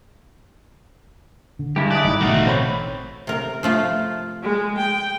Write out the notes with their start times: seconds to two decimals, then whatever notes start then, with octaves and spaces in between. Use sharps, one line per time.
1.59 D3
1.76 G2 G#3 E4 G4
1.91 D5 D#6 F#6
2.04 G#1 G3 D#4
2.21 A1 B2 D3 A3 F#4 F5
2.47 C4 C5 C#5 B5
3.27 C3 A#4
3.63 F3 A3 F4
4.43 G#3
4.78 G5